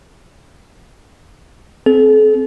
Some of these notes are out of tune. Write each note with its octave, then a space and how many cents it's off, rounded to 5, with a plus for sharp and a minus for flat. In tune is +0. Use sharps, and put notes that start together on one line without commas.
C4 +0 A4 -45